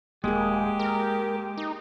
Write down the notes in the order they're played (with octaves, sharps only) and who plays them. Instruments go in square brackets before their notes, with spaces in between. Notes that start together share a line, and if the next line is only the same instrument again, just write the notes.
[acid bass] D#1 [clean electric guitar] G#3 [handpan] A#3 G#4 [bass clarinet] G4
[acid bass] A#4
D#4